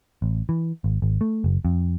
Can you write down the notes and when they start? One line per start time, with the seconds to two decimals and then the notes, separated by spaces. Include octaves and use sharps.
0.22 A1
0.49 E3
0.84 G#1
1.02 G#1
1.21 A3
1.44 F#1
1.65 F2